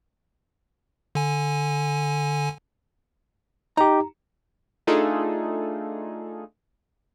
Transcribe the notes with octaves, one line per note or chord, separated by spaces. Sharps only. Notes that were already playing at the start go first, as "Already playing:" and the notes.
D3 G#5
D#4 G4 A#5
A3 D4 D#4 F4 G#4 A4